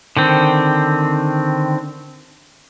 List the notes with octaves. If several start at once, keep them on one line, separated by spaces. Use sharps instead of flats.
D3 D#3 C4